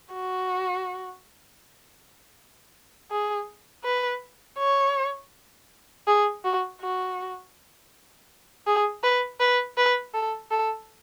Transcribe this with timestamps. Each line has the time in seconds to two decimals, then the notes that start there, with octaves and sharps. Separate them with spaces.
0.14 F#4
3.11 G#4
3.84 B4
4.59 C#5
6.08 G#4
6.45 F#4
6.81 F#4
8.67 G#4
9.03 B4
9.40 B4
9.77 B4
10.14 A4
10.51 A4